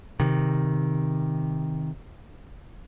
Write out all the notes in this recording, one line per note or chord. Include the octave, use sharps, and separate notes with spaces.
C3 D#3